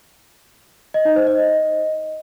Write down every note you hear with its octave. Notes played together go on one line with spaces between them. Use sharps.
D#5
D#4
C5
D#5